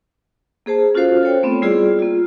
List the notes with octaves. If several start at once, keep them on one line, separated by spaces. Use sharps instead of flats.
A#3 G#4 C5 A5
C#4 F4 F#4 A4 C5 F5
A4 C5 C#5 G5
A3 B3 C4
G3 E4 F4 G#4 D5
A#3 F4